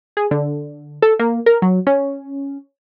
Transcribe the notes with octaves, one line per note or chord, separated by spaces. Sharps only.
G#4
D3
A4
A#3
A#4
F#3
C#4